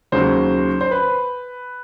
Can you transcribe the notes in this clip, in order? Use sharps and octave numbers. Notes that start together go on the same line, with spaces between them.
D#2 C#3 F#3 C5
C5
B4